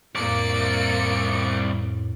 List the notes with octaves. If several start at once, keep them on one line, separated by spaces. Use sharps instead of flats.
C2 F2 A2 A#3 D5 C#7 D7